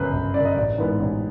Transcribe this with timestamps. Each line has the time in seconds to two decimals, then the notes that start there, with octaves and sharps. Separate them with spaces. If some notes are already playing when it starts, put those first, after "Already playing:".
Already playing: G1 F#2 C#3 B4 C5
0.13 G1
0.34 F#2 C#3 D5
0.45 D#5
0.56 A1 D5
0.78 G#2 E3 G#3 B3
1.00 A1